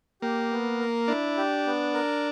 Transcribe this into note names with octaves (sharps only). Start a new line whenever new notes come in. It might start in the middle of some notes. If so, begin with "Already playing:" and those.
A#3 G4
B3
A#4
D4 E4
G4
B3
A#4